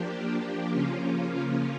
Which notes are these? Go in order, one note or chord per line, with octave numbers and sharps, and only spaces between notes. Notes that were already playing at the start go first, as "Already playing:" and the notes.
Already playing: F3 A#3 D4 G4
C#3 F3 A#3 C#4 F4